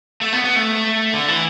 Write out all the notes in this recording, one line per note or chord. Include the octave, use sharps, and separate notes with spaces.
A3
B3
B3
A3
D3
E3